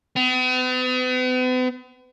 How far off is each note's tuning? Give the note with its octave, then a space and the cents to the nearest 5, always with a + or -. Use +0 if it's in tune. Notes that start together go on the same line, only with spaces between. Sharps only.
B3 +45